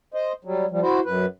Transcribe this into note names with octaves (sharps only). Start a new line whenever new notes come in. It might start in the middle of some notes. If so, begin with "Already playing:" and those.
C5 D#5
F#3 G3
F3 G3
E4 F#4 C5
F#2 B4